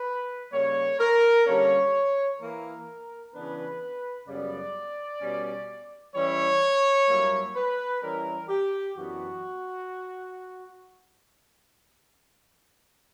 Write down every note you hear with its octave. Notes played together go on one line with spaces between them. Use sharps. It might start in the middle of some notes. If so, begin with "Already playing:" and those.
Already playing: B4
C#3 G3 A#3 C#5
A#4
D3 G3 A#3 C#4 C#5
E3 A#3 E4 A#4
C#3 E3 B3 D4 B4
F#2 C#3 G3 B3 D5
B2 G3 C#4
E3 G3 C#4 E4 C#5
G2 F#3 A#3 E4
B4
E3 G3 C#4 E4 A#4
G4
F#2 E3 B3 D4 F#4